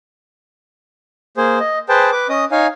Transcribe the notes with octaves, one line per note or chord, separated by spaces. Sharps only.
A#3 G#4 C5
D#5
G#4 B4 C5 G5 A5
B4 D6
C#4 D#5 D#6
D#4 C#5 F5 G#5